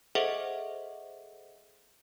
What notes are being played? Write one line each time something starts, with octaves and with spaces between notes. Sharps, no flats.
G#4 A4 C5 D#5 E5 F#5